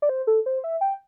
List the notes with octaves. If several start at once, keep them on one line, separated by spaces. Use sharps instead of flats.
D5
C5
A4
C5
E5
G5